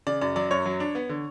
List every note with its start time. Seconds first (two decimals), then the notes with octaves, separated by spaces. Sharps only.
0.07 C#3 D5
0.21 F#2 D5
0.36 F#3 D5
0.51 F#2 C#5
0.66 F#3
0.80 D4
0.95 B3
1.09 D3